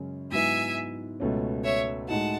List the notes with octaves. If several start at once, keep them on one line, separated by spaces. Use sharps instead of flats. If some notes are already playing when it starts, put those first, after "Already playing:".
Already playing: F#2 C#3 G#3 C#4
G#2 F#3 B3 E4 E5 G#5
C#2 B2 A3 C#4
C#5 E5
A2 G#3 D#4 F#4 F#5 A5